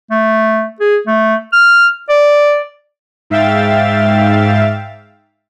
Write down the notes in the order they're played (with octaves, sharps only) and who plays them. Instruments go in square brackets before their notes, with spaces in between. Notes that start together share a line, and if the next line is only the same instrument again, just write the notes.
[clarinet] A3
G#4
A3
F6
D5
[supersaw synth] G#2 E5 F5 G5 A6